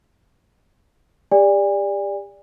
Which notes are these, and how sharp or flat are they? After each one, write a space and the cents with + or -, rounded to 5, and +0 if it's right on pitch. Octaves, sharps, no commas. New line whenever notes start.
G4 +35 D5 +0 G#5 -40